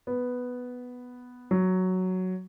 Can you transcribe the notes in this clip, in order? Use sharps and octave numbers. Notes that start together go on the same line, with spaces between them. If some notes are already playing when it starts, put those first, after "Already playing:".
B3
F#3